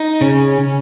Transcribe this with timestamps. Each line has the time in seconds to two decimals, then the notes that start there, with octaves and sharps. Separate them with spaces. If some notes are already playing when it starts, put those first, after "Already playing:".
Already playing: D#4
0.21 C#3 C#4